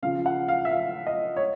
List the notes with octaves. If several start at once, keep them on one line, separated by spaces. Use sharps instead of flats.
C#3 F3 F5
F#5
F5
E5
F5
D#5
C#5